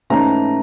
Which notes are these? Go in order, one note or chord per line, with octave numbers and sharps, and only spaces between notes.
G#2 E3 A3 C#4 A#5